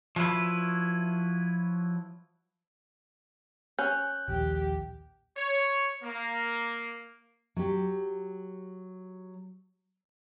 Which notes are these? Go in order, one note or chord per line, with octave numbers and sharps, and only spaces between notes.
F3 F#3 E4 B4
C#4 F#6 G6
A#1 D#2 G4
C#5
A#3
F#3 G4